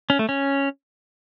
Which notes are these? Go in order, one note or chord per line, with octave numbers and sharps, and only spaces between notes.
C#4
A3
C#4